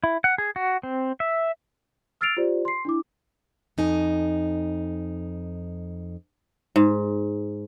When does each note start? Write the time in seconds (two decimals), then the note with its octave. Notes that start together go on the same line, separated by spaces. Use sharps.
0.04 E4
0.24 F#5
0.38 G#4
0.56 F#4
0.83 C4
1.20 E5
2.21 E6 F6 A6 C7 D7 F7
2.37 F4 G4 C5 D5
2.65 C6 C7
2.85 D4 E4 D6
3.78 F2 D#4 G#5
6.76 G#2